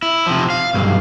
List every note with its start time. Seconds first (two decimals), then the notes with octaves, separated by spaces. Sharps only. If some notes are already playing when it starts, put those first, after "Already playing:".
0.03 E4
0.27 C3 F3
0.50 F5
0.74 B1 G2